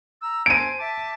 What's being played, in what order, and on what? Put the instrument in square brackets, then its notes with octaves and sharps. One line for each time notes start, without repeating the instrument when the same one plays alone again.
[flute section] A#5 E6
[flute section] C5 G#5 A5 [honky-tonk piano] D7 D#7
[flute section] E5 A5 D6